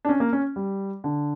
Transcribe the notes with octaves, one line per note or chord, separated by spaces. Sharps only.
D4
C#4
A#3
C#4
G3
D3